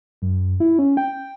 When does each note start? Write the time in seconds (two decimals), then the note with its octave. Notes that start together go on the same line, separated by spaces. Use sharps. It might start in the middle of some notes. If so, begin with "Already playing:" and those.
0.22 F#2
0.60 E4
0.79 C#4
0.97 G5